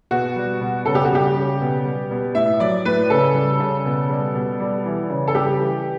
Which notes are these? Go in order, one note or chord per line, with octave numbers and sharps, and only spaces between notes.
B2 F#4
G3
B2
C#3 A4
G4
F#4
G3 G4
C#3
B2
G3
B2
A2 E5
F#3 D5
A2 B4
C#3 A4
G3
C#3
B2
G3
B2
G3
E3
C#3
A4
G3 G4
E3